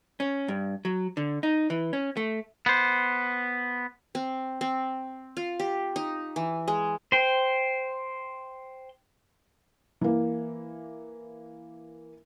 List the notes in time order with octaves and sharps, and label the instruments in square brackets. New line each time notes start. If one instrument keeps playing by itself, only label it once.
[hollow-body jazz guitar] C#4
G2
F#3
D3
D#4
E3
C#4
A3
[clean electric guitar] B3 C5
[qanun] C4
C4
F4
G4
D#4
E3
G#3
[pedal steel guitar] C5 G5
[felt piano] E3 A#3